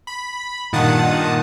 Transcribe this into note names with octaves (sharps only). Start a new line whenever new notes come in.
B5
G2 A#2 D#3 F#5 A5 D#6